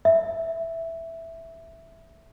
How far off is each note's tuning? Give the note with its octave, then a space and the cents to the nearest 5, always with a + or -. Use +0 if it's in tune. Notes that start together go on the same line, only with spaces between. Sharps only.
E5 +0